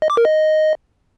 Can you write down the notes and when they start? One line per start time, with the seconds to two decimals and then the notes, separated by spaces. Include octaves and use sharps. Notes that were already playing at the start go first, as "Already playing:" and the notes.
0.02 D#5
0.10 D6
0.17 A#4
0.25 D#5